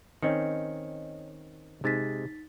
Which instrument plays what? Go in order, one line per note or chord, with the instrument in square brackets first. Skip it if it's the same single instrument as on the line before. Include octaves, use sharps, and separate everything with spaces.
[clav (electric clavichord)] D#3 C4 C#4 [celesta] C#5 D#5 C#7
[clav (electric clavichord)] C3 G#3 [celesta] D#4 A6 B6